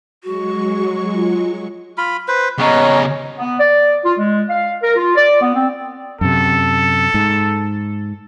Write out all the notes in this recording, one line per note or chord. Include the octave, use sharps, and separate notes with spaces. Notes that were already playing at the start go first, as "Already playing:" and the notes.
F#3 G#3 F#4 C#6
F4
F4 B5
B4 C5
C#3 B3 C#4 C#5 D#5 A#5
B3
D5
F4
G#3
F5
A#4
F4
D5
B3
C4
F#2 C3 A4
G#2